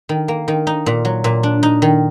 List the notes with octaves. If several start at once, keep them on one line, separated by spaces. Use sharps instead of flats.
D#3
A#3
D#3
D#4
A#2
F#3
A#2
D4
D#4
D#3